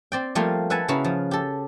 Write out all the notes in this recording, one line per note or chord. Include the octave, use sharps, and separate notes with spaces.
C4 D5 G5
F3 G3 A3 A#3 C4 F4
B4 E5 F#5 G#5 A5
C#3 E4 F#4 B4 A#5
F3
G4 A4